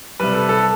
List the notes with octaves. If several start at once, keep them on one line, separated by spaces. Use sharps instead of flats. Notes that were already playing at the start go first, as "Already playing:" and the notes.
C3 G3 B4
A4
A4